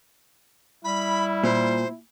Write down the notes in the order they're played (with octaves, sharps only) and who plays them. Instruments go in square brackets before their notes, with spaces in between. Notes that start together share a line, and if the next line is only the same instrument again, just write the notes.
[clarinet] G3 [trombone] E4 [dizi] B5
[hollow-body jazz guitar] A#2 [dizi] C5